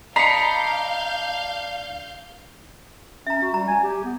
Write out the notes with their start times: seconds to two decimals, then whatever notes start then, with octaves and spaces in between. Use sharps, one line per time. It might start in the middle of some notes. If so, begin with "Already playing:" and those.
0.16 D4 D#5 F5 A#5 B5 G6 C7 C#7
3.27 C#4 E5 A#5
3.42 F#4
3.54 G3 A#5
3.68 G#5
3.83 G4
4.04 B3